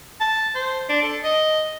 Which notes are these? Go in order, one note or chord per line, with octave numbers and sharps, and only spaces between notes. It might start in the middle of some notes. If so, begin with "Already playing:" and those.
A5
C5
D4
A4
D#5